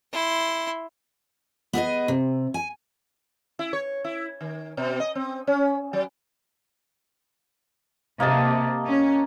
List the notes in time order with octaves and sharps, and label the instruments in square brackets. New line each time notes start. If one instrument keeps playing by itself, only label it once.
[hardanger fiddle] E4 C6
[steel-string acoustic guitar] B3 G#4 D5 D#5
C3
G#5
[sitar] E4
C#5
E4
D#3
B2
D#5
C4
C#4
F#3
[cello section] C3 [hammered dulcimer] A#3 D#5 A5
[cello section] C#4